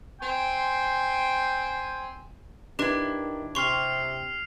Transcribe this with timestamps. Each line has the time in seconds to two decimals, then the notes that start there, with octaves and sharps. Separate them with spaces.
0.21 C4 G5 G#5 C6
2.79 D#3 D4 E4 G4 B4
3.55 C3 C6 C#6 F6 C7 F7